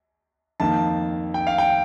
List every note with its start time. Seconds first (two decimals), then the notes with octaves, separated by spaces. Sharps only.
0.60 F2 D#3 A#3 A5
1.34 G5
1.47 F5
1.58 G5